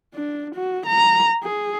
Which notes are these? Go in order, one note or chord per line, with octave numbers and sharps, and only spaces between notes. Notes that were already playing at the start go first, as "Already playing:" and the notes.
D4
F#4
A#5
G#4